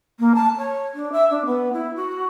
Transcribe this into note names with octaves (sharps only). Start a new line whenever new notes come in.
A#3
A5
C#5
D4
E5
D4
B3
E4
F#4